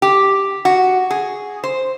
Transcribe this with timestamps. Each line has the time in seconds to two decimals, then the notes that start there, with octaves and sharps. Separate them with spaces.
0.02 G4
0.65 F#4
1.10 G#4
1.64 C5